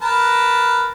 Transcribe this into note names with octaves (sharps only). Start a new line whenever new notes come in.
A#4 B4 A5